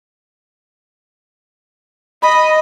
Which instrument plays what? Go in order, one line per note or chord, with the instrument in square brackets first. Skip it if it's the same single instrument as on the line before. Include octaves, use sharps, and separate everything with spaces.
[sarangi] D#5 [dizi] B5